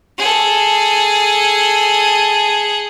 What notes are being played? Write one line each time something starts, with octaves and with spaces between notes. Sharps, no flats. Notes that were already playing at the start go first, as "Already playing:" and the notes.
G#4 A4